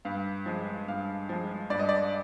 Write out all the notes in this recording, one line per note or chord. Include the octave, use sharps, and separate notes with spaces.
G2 F5
F3 G#3
G2 F5
F3 G#3
G2 D5
D#5
D5